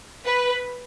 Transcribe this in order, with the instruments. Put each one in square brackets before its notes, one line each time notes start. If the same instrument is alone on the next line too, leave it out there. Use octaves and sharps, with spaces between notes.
[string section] B4